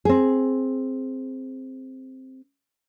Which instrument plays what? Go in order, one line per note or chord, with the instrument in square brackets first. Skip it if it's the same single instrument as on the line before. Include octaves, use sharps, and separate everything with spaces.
[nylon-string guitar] C4 G#4